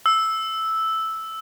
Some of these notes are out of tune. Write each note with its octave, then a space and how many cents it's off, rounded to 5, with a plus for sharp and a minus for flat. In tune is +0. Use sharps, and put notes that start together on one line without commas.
E6 -5